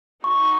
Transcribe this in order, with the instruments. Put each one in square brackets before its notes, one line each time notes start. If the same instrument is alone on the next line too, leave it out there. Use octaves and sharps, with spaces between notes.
[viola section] D#4 F#4 [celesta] C#6